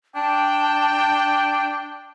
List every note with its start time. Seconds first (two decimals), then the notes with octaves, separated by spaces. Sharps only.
0.16 D4 G5 A5